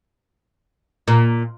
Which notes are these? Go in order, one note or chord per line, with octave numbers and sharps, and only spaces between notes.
A#2